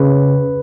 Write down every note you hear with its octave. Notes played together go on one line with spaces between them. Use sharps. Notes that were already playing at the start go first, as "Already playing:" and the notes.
Already playing: C#3 B4